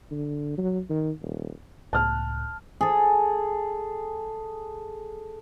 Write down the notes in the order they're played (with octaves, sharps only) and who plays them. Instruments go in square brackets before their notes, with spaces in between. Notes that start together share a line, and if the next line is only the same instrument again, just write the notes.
[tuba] D3
F#3
D#3
D#1
[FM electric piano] C#2 A2 F#6 [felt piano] A5 F6
[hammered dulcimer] G#4 A4